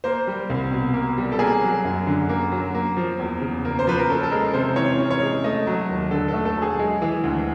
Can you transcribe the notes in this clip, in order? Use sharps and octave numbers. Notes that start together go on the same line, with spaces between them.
A#3 C5
G3
C2
B2
A#3
G3
A4
A#3 G#4
F#3
F#2
D3
A#3
F#3
A#3
F3
E2
C#3
A#3
C5
F3 B4
A#4
C#4 A4
A4
G#3 A#4
C3 C5
E3 C#5
C#4
C#5
G#3
A3 D#5
F#3
D#2
D3 A4
A4
A3
A4
F#3 G#4
G#3
E3
D2